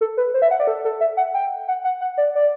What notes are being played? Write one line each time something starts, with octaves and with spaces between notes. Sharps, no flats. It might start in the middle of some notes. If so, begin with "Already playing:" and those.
A4
B4
C5
E5
F#5
D5
A4
A4
E5
F#5
G5
F#5
F#5
F#5
D5
D5